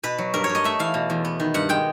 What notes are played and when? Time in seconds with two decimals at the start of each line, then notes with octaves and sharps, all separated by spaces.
0.03 B2 B4
0.18 F#3
0.34 G2 A#4
0.44 C#5
0.49 G2
0.55 D#5
0.64 A3 E5
0.79 E3 F5
0.94 B2
1.10 E2
1.25 B3
1.40 D#3
1.54 G2 F#5
1.69 G#3 G5